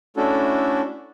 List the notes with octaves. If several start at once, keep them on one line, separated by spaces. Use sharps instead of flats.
A3 C#4 D4 E4 F#4 A4